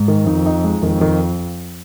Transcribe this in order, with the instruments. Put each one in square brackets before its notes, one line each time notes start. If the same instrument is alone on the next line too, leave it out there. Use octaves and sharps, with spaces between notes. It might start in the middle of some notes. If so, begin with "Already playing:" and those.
Already playing: [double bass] G#2
[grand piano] D#3
[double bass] F2 [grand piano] D#4
[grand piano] D#4
G#3
[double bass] F2 [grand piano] D#3
[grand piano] D#3